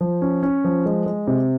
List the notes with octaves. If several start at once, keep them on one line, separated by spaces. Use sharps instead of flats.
F3
C#4
C#4
F3
G#3
G#3
C3